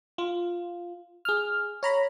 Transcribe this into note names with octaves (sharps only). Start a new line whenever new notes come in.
F4
G#4 F6
C#5 A#5 B5